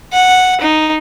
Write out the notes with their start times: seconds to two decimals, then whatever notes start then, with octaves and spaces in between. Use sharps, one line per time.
0.13 F#5
0.61 D#4